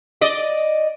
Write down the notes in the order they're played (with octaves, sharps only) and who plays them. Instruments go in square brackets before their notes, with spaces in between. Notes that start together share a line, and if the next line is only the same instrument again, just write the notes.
[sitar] D5 D#5